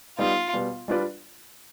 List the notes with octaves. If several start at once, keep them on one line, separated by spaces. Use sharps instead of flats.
G3 B3 D#4 F4
B2 G3 B3
G3 D4 F4 B4 D5